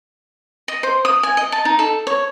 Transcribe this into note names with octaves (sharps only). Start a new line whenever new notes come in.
D#5
C5
D#6
G#5
D#5
A5
D#4
A4
C#5